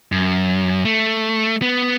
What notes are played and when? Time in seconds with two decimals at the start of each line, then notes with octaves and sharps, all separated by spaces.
0.12 F#2
0.85 A3
1.62 B3